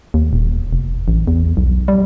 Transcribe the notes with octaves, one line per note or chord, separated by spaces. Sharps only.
D#2
D#1
F1
A1
E2
B1
G3